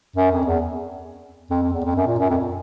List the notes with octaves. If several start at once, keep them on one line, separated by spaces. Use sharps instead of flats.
F#2
F2
E2
F2
F2
E2
F2
F#2
A#2
F#2
F2